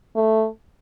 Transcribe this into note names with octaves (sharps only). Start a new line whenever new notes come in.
A3